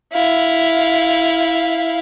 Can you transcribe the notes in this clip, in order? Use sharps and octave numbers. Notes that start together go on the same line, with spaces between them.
E4 F5